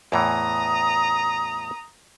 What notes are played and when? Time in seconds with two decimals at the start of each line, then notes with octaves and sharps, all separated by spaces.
0.12 E2 A2 E3 A#5 D#6